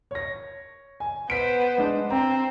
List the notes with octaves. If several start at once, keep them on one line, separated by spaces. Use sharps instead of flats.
C#5 A#6
G#5
B3 C5 B6 D7
G#3 D4
C4 A#5